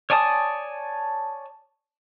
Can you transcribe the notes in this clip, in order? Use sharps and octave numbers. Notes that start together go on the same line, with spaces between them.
C#5 D5 G#5 A5 D#6